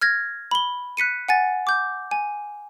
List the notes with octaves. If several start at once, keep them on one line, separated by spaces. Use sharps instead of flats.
F6 G#6 A#6
B5 G7
F#6 B6 C#7 D#7
F#5 G#5 A6
D6 G6
G#5